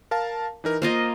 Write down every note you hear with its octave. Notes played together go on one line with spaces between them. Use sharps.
A#4 F5 A5
E3 D#4 A#4
A#3 F4 C5 D#5